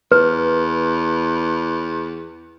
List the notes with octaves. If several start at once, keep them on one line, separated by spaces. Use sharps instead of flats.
E2 B4